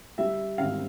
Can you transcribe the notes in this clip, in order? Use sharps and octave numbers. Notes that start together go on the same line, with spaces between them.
G3 E5
G#1 F5